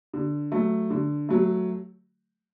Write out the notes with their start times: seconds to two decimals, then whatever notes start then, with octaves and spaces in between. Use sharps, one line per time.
0.14 D3
0.52 F#3 A3
0.90 D3
1.29 F#3 A3